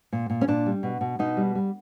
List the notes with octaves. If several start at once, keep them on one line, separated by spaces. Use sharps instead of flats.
A#2
A#2
C#4
A#2 D4
G3
B2
B2
B2 D#4
G3
G3